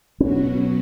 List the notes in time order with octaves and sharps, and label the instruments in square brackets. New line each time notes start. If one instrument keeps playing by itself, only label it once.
[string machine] B2 F#3 B3 F#4 [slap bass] C#4